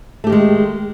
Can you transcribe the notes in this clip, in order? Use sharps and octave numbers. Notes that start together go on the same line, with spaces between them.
D#3 G#3 A3 G4